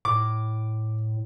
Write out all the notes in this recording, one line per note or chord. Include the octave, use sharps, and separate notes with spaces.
A2 D6